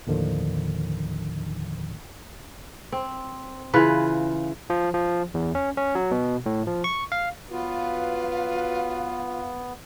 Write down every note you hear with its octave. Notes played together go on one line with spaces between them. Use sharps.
D#2 A2 D3 D#3 F3
C4
C#3 E3 F4 B4
F3
F3
E2
C#4
C#4
F#3
B2
A2
F3
C#6
F5
F#3 B3 F4 F#4 B4 F5